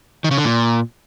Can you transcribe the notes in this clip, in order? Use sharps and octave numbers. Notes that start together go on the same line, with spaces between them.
D#3
C#3
D3
A#2